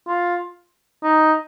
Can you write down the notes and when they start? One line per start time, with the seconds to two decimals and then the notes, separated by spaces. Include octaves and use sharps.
0.08 F4
1.03 D#4